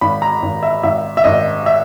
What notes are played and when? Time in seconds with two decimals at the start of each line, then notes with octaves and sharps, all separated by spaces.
0.01 G#1 B5
0.22 A#5
0.42 G#1
0.63 E5
0.83 G#1 E5
1.17 E5
1.24 G#1 D#5
1.66 E5